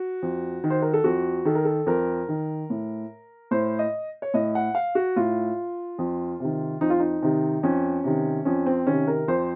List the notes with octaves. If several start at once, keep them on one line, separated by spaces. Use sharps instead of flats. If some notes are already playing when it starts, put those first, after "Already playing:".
Already playing: F#4
F2
D#3
C5
A#4
A4
F2 F#4
D#3 A4
A#4
A4
F2 A#4
D#3
A2
A2 C5
D#5
C#5
A2 D#5
F#5
F5
F#4
A2 F4
F2
C3 D#3
F2 D#4
F4
D#4
C3 D#3
F2 C#4
C3 D#3
F2 C#4
C4
C3 D#3 C#4
A#4
F2 C5